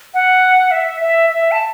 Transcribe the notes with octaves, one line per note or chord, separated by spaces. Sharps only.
F#5
E5
E5
E5
A5